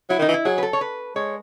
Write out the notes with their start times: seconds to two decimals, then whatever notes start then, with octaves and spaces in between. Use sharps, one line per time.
0.09 F#3 E4
0.19 D#3 D#4
0.28 E3
0.34 E4
0.45 F#3 G#4
0.58 B4
0.63 A4
0.73 C#5
0.81 B4
1.16 G#3 C#5